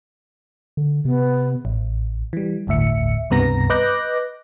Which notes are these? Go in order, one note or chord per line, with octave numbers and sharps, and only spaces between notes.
D3
C3 B3
A1
E3 G3
G1 D2 A2 E5 C#7
C#2 G2 C3 B3 A#5 A#6
B4 D#5 D6 F#6 G6 A#6